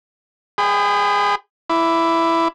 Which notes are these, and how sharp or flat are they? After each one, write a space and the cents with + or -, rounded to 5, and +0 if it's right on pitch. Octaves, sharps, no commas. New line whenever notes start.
G#4 -20 G5 +10 B5 +35
E4 +5 D6 -10